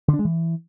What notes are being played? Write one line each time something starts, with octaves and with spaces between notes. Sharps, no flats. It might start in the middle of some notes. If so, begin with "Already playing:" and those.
D3
D4
G#3
E3